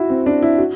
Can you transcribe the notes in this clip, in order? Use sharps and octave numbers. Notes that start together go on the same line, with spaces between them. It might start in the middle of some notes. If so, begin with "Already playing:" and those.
Already playing: E4 F#4
C4
D4
E4
F#4